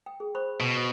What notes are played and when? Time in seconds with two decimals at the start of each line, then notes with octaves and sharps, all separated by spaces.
0.06 G5
0.20 G#4
0.35 C5 B5 C#6
0.60 B2